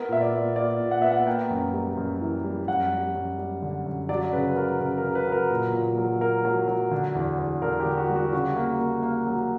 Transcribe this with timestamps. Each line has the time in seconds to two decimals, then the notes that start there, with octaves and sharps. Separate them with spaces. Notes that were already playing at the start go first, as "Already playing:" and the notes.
Already playing: B3 A#4
0.09 A#2 E5
0.21 D5
0.33 A#2
0.56 A#2 D5
0.80 A#2
0.91 F#5
1.02 B3 E5
1.12 F#5
1.27 A#3 G5
1.50 F#2
1.73 G3
1.97 F#2
2.21 E3
2.44 G3
2.68 F#2 F#5
2.92 G3
3.15 F#2
3.38 G3
3.62 D3
3.86 F#2
4.09 F#3 D5
4.33 C#3 B4
4.56 F#3 A#4
4.80 C#3 A#4
4.98 A#4
5.03 C#3
5.15 B4
5.27 F#3 A#4
5.50 A#2
5.73 A#2
5.98 F#3
6.21 A#3 A#4
6.45 F#3
6.68 F#3
6.91 D3
7.15 E2
7.38 E2
7.62 D3 A#4
7.80 G4
7.85 D3
7.97 F#4
8.09 G3
8.16 F#4
8.33 C#3 F#4
8.56 A#3
8.80 A#3
9.03 A#3
9.27 F#3